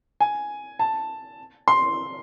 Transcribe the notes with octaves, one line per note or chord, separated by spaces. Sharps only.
G#5
A5
C6